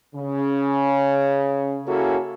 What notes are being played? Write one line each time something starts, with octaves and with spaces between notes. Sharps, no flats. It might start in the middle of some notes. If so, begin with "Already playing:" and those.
C#3
A#3 C#4 E4 F#4 G#4 A4